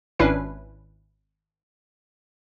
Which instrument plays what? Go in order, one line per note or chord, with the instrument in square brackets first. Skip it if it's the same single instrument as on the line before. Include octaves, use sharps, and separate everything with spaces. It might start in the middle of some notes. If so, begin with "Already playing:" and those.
[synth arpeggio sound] G#1 C#4 D4 E4 B4 C7